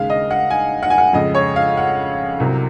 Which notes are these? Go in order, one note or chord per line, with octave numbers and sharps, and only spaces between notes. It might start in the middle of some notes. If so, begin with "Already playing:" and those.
Already playing: D#2 C#3 G#3 F5
D#5
F#5
G#5
F#5
G#5
F#5
F2 C#3 G#3 D#5
C#5
F5
F#5
C2 C3 F#3